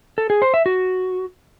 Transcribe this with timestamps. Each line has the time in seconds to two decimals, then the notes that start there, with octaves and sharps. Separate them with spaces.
0.18 A4
0.30 G#4
0.42 C5
0.54 E5
0.66 F#4